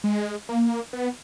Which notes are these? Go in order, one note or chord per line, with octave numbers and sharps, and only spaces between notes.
G#3
A#3
B3